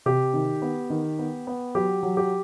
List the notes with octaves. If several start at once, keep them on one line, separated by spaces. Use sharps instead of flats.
C3 G4
D#3
B3
D#3
B3
B3
F#3 G4
F#3
G4